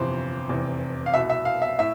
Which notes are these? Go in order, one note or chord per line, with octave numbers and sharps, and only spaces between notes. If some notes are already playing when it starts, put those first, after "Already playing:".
Already playing: G1 F2 C3 E3 C5
F1 E2 C3
F5
C2 B2 E5
E5
F5
E5
A2 E5